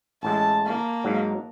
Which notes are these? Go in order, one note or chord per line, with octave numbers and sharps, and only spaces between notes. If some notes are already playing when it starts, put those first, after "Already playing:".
A1 A2 G#3 A5
A#3
G#2 F#3